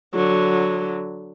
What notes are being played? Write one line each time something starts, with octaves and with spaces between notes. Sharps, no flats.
D3 F#3